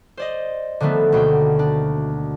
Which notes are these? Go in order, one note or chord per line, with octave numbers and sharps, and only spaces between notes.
C5 D5 D#5
D3 D#3 F3 A3 B3
D2 B2 A#3 G5
D4